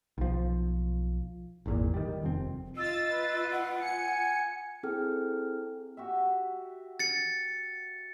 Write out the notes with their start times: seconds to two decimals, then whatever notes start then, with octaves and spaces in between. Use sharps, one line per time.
0.18 B1 F3
1.66 G#1 E2 A#2
1.94 D#3 G3
2.23 F1 C4
2.76 F4 D#5 E6 A6
3.12 B4
3.51 F#5
3.81 G#5 C#7
4.83 C4 E4 G#4 A4 G5 F6
5.97 F#4 G4 E5
6.99 A6 C#7